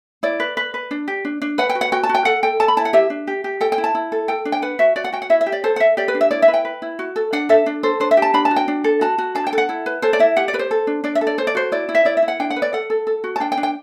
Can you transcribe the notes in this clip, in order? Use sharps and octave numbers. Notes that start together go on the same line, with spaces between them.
E4 D5
B4
B4
B4
D4
G4
D4
D4
B4 F#5
G5
F#4
F#5
F#4 G5
A5
F#4
G5
A4 F#5
A4 G5
A4 A5
B5
E4 A5
F#5
G4 E5
D4
G4
G4
A4 G5
G5
E4
A5
E4
A4
A4 G5
D4
G5
B4 F#5
F#4 E5
F#4 D5
F#5
F#4 G5
F#5
E4 E5
E5
G4
D5
A4 C5
F#5
A4 E5
G4 D5
B4
D4
E5
E4 D5
E5
B4
G5
B4
E4
F#4
A4
D4 F#5
A4 E5
D4
A4 C5
D4 C5
E5
G4
A5
D4 B5
A5
F#4
G5
D4
A4
F#4 A5
F#4
D4 A5
G5
A4
F#5
E4
B4
A4 C5
D5
E4 E5
G4 F#5
D5
G4 B4
C5
A4
D4
D4 D5
E5
A4
D5
A4 C5
D5
F#4 C5
E4 D5
E4
E5
E4 D5
E5
E4
F#5
D4 G5
F#5
B4
D5
A4 F#5
A4
A4
F#4
A5
D4 G5
G5
D4
G5